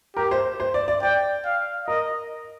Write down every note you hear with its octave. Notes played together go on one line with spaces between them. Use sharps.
G4 A#4
C5
C5
D5
D5
D5 G5
F5
A#4 D#5